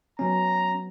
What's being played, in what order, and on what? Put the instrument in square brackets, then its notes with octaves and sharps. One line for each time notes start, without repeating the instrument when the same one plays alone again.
[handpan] F#3 B3 [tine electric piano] C#4 [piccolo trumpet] A#5